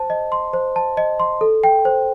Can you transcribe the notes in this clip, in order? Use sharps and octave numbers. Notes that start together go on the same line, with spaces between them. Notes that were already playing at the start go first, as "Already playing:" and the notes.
Already playing: C5 A5
D#5
C6
C5
A5
D#5
C6
A4
G5
C5